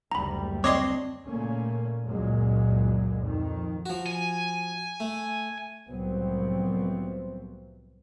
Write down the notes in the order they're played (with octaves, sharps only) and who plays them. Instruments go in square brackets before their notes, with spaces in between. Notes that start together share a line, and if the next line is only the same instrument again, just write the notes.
[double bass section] F#1 D2 G3 [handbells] A#5 B5
[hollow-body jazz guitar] C4 D4 [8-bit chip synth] C#5 D#5 C6 [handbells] D6
[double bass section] A#2 C#3 A3 A#3 C#4
C#2 F#2 A#2 F#3 G#3
F2 D#3
[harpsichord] F3 F#4
[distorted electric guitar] G#5
[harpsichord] A3
[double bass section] C2 A2 F3 F#3 B3 C4